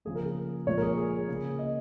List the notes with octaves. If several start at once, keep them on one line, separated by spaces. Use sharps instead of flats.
C#3 F3 A#3 G#4
A#4
G#4
A#2 F3 G#3 C#5
A#4
G#4
G#4
C#3 A#3
D#5